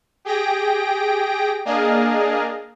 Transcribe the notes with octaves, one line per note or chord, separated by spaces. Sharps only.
G4 G#4 G5 A#6 D7
A#3 D4 G#4 D#5 F5